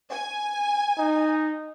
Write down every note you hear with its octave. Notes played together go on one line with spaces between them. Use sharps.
G#5
D#4